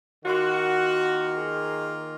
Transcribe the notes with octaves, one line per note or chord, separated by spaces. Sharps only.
D#3 A#3 F4 F#4
G#4